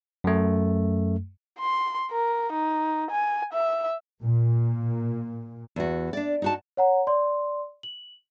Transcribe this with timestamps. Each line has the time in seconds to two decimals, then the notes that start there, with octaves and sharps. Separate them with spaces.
0.24 F#2 A3
1.59 C6
2.11 A#4
2.53 D#4
3.11 G#5
3.53 E5
4.23 A#2
5.76 E2 F#4
6.13 D4 D5
6.42 D#4 F#4 A5
6.77 C#5 F#5 A#5
7.07 D5 C6
7.83 F#7